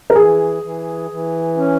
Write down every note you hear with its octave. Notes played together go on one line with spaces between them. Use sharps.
A#4
E3 G#4
E3
E3
C#4